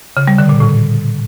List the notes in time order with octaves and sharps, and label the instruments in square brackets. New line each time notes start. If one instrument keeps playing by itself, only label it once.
[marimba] C#3
G3
D3
A#2
A2